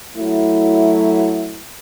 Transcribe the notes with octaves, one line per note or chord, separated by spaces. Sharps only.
F#3 A3 E4